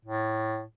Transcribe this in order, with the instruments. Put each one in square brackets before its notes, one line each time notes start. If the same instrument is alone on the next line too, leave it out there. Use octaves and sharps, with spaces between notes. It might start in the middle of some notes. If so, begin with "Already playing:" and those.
[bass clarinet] A2